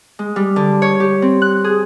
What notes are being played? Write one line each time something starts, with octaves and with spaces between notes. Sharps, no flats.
G#3
G3
D3
C#5
G4
C4
F#6
G#4